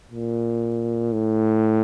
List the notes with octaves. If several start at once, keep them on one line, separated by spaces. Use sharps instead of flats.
A#2
A2